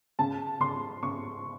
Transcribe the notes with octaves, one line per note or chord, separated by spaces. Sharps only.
C#3 A5
C#3 C6
C#3 C#6